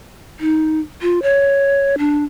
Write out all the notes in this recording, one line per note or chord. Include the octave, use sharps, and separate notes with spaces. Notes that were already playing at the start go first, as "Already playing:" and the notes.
D#4
F4
C#5
D4